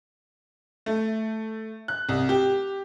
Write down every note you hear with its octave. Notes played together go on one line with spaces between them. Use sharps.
A3
F#6
C2
G4